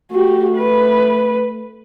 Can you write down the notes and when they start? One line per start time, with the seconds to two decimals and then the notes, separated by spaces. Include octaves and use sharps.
0.11 A3 F#4 G4
0.57 B4